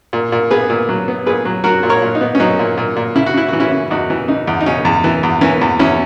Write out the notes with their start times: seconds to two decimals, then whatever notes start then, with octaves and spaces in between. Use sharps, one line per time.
0.13 A#2
0.32 A#2
0.51 B3 G#4 B4
0.70 A#2
0.89 F#3
1.08 B3
1.26 A#2 G#4 B4
1.45 F#3
1.64 F#3 F#4 A#4
1.83 A#2
1.89 A#4 C#5
2.02 A#2
2.15 D#4
2.21 B3
2.35 C#4
2.40 F#3 D#4
2.59 A#2
2.77 A#2
2.96 A#2
3.15 C#3 E4
3.26 F#4
3.34 C#3 E4
3.48 E3 F#4
3.60 C#4 E4
3.72 C#3
3.91 E2 D#4 F#4
4.10 E3
4.28 C#3 D#4
4.47 E2
4.61 D#4
4.66 C#3 C#4
4.85 E2
5.04 E3
5.23 E2
5.41 E3 C#4
5.61 E2
5.79 E2 C#4 E4